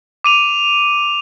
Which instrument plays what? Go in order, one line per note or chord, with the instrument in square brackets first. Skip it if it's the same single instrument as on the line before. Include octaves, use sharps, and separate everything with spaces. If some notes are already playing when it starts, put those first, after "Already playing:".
[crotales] D6 D#7 F7